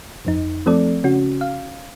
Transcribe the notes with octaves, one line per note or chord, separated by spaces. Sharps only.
G1 F2 D#4
F3 A3 C4 A4 D5
C#3 C#4 F#4
F5